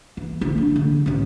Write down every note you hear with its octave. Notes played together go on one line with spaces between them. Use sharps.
E3
D2 E4
D4
D3
A1 C#4